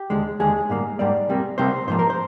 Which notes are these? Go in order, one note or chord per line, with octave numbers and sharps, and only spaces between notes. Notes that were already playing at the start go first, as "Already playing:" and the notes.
Already playing: G4
D#2 D3 G#3
D#2 D3 G#3 G#4
G#2 G3 A#3
G#2 G3 A#3 D5
C2 C3 G3 A#3
C2 C3 G3 A#3 C5
G#2 F3 A#3 C5
A#4
C5